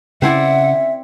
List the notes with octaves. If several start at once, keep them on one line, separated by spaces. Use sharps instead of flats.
C#3 C4 E4 D5 E5 F#5